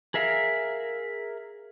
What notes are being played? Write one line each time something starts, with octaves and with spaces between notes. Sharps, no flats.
G#4 A#4 E5 F5